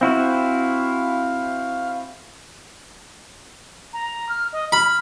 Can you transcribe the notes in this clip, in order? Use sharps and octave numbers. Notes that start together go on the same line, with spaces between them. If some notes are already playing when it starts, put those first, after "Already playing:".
C4 E4 F#4 F5
A#5
F6
D#5
B5 F6